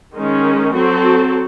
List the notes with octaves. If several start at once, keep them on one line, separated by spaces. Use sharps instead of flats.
D#3 G#3 C#4
F#3 C4 F#4 A4